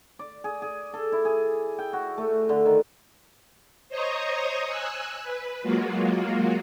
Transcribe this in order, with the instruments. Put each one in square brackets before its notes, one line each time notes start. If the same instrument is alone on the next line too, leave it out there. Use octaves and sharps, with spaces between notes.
[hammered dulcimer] D5
G#4
G#4
A4
E4
G#4
G5
F#4
A3
D3
D#3
[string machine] C5 C#5 D#5 A#5 C#6 D#6
G#5 E6 F#6
B4
F#3 G#3 A#3 F4 F#4